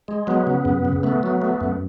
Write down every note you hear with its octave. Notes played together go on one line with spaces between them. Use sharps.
G#3
F#3 B3
C#3
F#2
C#3
A3 B3
F#3
A3
F#2